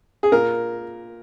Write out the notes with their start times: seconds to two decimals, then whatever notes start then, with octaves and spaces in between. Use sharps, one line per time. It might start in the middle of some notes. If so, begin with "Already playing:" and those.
0.23 G#4
0.32 A#2 A#4